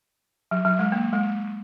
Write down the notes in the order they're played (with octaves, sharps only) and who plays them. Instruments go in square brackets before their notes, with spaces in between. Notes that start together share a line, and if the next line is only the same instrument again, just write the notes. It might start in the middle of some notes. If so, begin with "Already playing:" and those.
[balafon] F#3
F#3
G#3
A#3
G#3